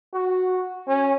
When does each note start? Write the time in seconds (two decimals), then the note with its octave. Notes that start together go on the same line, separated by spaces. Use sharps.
0.13 F#4
0.88 C#4